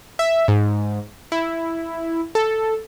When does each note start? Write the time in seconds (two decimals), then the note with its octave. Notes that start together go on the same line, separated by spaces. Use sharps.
0.19 E5
0.48 G#2
1.32 E4
2.35 A4